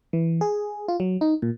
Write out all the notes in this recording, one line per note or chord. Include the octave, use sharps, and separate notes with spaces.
E3
G#4
F4
F#3
D#4
A#2